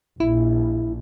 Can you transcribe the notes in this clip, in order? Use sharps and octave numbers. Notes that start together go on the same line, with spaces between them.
A#1 E4